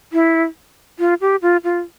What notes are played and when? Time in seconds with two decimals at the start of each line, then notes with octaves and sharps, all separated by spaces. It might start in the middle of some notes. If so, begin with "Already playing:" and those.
0.13 E4
0.99 F4
1.21 G4
1.42 F4
1.64 F4